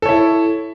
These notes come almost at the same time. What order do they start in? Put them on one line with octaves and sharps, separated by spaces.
A4 C#5 E4